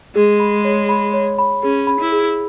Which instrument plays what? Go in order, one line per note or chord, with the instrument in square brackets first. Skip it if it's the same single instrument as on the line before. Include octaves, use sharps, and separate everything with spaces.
[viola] G#3 [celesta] G#4
[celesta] B5
C#5
B5
C#5
B5
[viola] C#4 [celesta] G#4
[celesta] B5
[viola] E4
[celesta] G#4